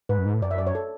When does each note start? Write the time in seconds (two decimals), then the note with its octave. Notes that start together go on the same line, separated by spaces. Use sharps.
0.09 G#2 B4
0.18 F#2
0.25 G#2
0.34 A2
0.42 F#2 D5
0.51 E5
0.58 D5
0.67 C#5
0.75 A4